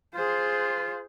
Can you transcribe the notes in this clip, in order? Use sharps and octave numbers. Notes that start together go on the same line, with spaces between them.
F4 G#4 C5